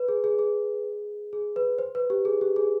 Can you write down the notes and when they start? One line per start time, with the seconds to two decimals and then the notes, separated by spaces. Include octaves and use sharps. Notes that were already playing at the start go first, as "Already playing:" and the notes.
Already playing: B4
0.08 G#4
0.24 G#4
0.39 G#4
1.33 G#4
1.56 B4
1.78 C5
1.95 B4
2.10 G4
2.25 G#4
2.41 G4
2.56 G#4